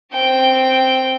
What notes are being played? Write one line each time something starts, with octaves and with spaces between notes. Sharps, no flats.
C4 G5